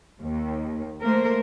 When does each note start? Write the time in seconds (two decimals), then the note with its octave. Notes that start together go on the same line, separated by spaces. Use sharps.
0.21 D#2
1.02 A3 A#3 A#4 C5